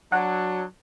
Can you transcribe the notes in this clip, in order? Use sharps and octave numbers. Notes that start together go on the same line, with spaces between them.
F#3 D4 F#5